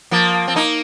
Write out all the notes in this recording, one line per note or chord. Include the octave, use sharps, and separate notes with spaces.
F3 A#3
C4
A#3 D#4